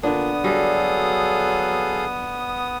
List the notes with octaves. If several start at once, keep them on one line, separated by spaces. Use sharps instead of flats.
A#2 D3 B3 D4 D#6
F#3 G3 F#4 G#4 A4 F5